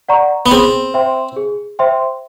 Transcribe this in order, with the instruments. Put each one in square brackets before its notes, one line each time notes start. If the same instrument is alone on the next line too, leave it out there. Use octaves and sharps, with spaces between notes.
[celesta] D5 F#5 A#5 C#6
[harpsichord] B3
[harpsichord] C4 [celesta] G#4
[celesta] C5 E5 G5 C6
G#4
C5 E5 G5 C6